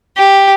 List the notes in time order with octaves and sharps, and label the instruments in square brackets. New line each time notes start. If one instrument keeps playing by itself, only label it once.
[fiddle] G4